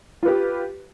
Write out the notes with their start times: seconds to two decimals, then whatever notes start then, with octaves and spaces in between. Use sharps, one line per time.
0.23 F4
0.25 B4
0.28 G4